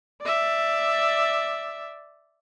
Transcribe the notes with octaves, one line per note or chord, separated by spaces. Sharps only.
D5 E5